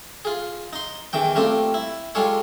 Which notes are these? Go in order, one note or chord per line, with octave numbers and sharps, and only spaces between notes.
F4 G#4
D#4 C6
E2 D#3 E3 G5
G3 A3 A#3 C4 F4
E4
G3 G#3 F4 G#4 A4 C#5